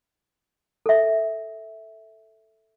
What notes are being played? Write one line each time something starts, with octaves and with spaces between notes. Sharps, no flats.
A4 E5